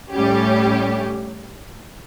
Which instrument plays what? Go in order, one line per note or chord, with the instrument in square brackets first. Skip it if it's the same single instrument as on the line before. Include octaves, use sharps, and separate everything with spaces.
[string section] A2 G3 C#4 G4